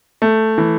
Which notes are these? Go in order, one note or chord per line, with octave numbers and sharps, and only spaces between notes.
A3
E3